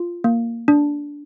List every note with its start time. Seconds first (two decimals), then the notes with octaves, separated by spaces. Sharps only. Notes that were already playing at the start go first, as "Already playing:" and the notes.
Already playing: F4
0.24 A#3
0.68 D4